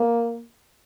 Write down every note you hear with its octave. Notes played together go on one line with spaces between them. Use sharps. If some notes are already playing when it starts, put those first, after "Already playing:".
Already playing: A#3